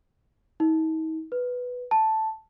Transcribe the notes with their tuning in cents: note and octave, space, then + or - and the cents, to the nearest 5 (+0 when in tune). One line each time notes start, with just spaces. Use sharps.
D#4 +40
B4 +0
A5 +0